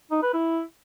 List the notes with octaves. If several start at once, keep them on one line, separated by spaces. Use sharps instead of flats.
D#4
B4
E4